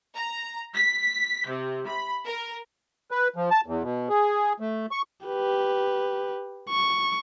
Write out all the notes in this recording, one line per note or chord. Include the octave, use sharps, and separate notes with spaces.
A#5
B6
C3
B5
A#4
B4
F3
A5
E2
B2
G#4
A3
C#6
G4 B4
C#6